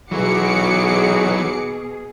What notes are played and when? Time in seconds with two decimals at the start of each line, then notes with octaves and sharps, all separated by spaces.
0.11 B1 B2 E3 F#3 F#4 G#4 D6 C#7